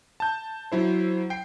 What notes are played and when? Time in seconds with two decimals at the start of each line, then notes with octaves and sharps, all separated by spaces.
0.20 A5 G6
0.72 F#3 E4 C5
1.30 G5 C7